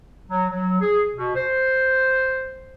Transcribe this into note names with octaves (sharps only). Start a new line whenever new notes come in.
F#3
F#3
G#4
B2
C5